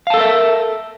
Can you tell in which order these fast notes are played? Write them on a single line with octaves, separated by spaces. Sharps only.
F5 A5 A4 A#4 E5